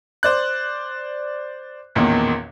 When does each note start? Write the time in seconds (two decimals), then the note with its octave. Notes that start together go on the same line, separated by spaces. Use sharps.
0.23 C5 D5 F#6
1.95 A1 E2 A#2 D#3